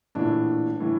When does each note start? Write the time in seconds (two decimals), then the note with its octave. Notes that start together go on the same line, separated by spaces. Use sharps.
0.15 A#1 A2 E3 D4
0.80 A2 E3